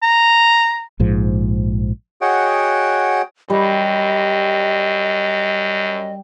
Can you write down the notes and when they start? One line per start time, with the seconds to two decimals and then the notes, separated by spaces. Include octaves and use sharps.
0.03 A#5
1.00 A#1 G#2 F3
2.21 F#4 G#4 C#5 D#5 F#5 G5
3.50 F#2 G3 D#5